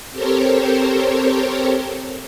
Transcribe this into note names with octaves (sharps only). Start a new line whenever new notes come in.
C4 G4 A4 A#4 C5 C#5